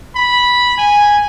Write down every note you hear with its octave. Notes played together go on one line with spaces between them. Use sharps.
B5
G#5